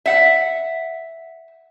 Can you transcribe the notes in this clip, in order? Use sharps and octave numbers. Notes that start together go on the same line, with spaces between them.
E5 F#5